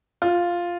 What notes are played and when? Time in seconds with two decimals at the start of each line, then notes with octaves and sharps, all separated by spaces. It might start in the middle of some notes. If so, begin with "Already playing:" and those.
0.22 F4